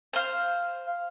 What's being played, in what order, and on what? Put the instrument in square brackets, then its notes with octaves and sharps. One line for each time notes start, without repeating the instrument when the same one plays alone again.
[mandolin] C5 F5